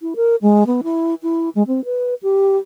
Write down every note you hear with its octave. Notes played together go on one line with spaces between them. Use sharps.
E4
A#4
G#3
B3
E4
E4
G#3
C4
B4
G4